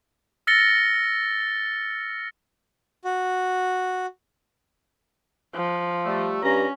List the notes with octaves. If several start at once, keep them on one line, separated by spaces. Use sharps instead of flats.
E6 F6 A6 A#6 C#7 G7
F#4
F3
G3 A3
G2 C#4 A#5